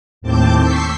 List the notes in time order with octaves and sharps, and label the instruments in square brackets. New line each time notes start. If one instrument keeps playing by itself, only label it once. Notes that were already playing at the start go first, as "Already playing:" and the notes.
[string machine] D#2 A2 C4 A5 D6 G6
C#6 E6 G6 B6 C7